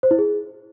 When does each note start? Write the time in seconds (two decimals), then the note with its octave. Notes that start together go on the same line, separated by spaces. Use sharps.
0.03 C5
0.11 E4
0.19 G#4